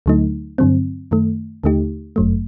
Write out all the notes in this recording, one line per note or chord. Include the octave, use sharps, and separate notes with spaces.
D2 D3 F#3 A3 D#4
G2 D3 F#3 C4
F#2 D#3 A3
D#2 D3 A3 D#4 G4
G1 F#2 F#3 A3